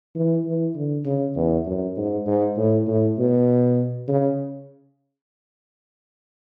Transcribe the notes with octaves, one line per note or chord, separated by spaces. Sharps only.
E3
E3
D3
C#3
E2
F#2
G#2
G#2
A2
A2
B2
C#3